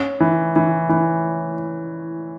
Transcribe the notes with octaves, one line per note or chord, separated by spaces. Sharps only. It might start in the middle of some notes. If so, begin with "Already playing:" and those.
Already playing: C#4
E3
E3
E3